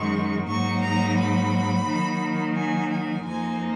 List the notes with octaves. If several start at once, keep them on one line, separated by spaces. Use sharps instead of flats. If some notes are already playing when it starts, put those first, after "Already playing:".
Already playing: F#2 D#3 G#3 C#6
G#2 F#3 A#3 D#4 C#6
A#5
B5
D#3 F#3 A#3
G#5
G#5
F2 F3 A#3 D#4 G#5